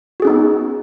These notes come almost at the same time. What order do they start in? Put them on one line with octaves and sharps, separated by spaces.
F#4 G#4 C#4 D#4 B3